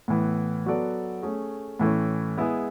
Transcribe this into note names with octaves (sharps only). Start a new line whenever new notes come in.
A2 E3 B3
F#3 B3 F#4 A4 D5
A3 C#4 G#4
A2 E3 A3 C#4
G#3 B3 E4 G#4